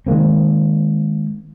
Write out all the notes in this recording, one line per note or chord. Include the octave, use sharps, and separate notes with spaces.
D#3 G#3 A#3 C4